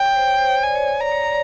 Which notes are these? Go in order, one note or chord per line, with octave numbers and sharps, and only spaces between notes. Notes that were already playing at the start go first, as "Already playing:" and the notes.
Already playing: C#5 G5
C5
C#5
C5
C#5
D5 G#5
C#5
C#5
D5 A#5
C#5
D5